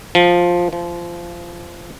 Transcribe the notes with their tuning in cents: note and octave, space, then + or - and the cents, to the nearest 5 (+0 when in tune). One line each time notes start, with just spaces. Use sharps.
F3 +5
F3 -20